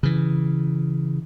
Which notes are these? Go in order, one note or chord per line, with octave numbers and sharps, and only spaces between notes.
C#3 E3